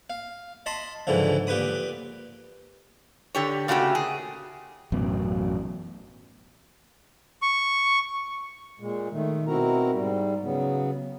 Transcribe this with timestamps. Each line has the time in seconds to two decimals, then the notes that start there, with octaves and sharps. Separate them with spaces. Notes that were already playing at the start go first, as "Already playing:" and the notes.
0.10 F5
0.66 D#5 A5 B5 C6
1.07 C#2 G#2 D3 E3 F3
1.47 A#2 G4 B4 B5 D#6
3.35 D3 G4 C#5
3.68 A#2 C#3 A3 F#4 G4
3.95 G#4
4.92 A1 F#2 B2
7.42 C#6
8.80 A#2 G#3
9.11 D#3 A3
9.47 B2 C4 E4 F#4 A#4 A#5
9.92 G#2 G3
10.43 C#3 F#3 B3